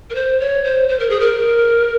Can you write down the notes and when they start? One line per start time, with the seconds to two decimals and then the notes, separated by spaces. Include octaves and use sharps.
0.10 A#4
0.15 C5
0.40 C#5
0.64 C5
0.89 C5
1.00 A#4
1.10 G#4
1.20 A#4